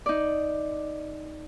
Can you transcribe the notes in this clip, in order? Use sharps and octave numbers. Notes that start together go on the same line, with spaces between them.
D#4 D5